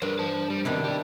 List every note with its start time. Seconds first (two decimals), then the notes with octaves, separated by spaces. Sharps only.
0.02 G2 A#4 C5
0.19 C5 A5
0.50 G3
0.65 C3 D#3 B3 D4 E4
0.84 G4 D5